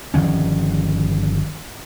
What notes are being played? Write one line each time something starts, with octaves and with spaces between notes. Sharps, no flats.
G1 D#3 F3 C#4